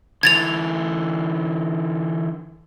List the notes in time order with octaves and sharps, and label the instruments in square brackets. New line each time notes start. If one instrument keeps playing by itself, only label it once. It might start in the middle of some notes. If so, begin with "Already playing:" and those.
[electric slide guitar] D3 E3 [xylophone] G#6 A6 F7